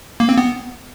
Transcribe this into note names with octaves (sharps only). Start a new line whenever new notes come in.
A#3
C4
B3